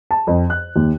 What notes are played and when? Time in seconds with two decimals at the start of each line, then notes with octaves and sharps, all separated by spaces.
0.11 A5
0.27 F2
0.50 F#6
0.76 D#2